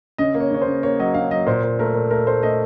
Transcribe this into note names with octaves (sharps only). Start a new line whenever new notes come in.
C#3 D#5
A#3
C#5
C#3 C#5
C5
C#3
A#3 C#5
F#3 D#5
C#3 F5
F#3 D#5
A#2 C5
A#2
A3 A#4
A#2
A3 A#4
A3 C5
A3 D#5